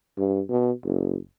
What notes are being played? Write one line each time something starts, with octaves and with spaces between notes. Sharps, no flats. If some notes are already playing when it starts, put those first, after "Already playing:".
G2
B2
F#1